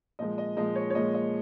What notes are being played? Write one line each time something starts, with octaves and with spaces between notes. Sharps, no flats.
A#2 F3 G#3 D#5
D#5
A#2 F3 G#3 D#5
C#5
C#5
A#2 F3 G#3 D#5
D#5